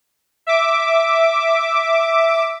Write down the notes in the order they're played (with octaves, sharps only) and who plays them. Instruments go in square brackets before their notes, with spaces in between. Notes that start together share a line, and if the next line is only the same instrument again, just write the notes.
[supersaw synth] E5 D6